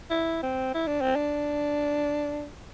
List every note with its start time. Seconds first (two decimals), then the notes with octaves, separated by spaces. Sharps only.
0.10 E4
0.43 C4
0.74 E4
0.87 D4
1.01 C4
1.16 D4